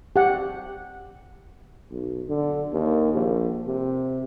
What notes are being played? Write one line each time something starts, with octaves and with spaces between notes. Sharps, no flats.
G4 F#5
B1
D3
D#2
A#1
C3